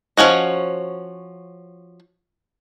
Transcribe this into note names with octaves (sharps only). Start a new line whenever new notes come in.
F3 C#4 F#4 D#5